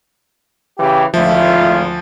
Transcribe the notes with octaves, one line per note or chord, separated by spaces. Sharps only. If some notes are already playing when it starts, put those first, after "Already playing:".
C#3 E3 G4 G5
G#1 D2 A2 F3 F4 E5